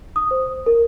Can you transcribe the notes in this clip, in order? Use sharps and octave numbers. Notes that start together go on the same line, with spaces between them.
D#6
C5
A#4